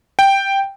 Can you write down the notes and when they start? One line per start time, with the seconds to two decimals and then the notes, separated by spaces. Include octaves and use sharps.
0.19 G5